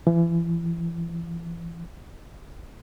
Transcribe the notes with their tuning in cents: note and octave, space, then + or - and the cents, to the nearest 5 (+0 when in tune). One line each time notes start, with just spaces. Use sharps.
E3 +35